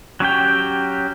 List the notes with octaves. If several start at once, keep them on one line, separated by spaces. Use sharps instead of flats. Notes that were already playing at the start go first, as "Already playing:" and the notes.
F#3 C#4 G4 G5